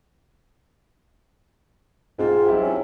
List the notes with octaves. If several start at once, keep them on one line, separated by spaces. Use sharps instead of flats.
G#2 G#3 C4 F4
F#3 E4 G4
C#4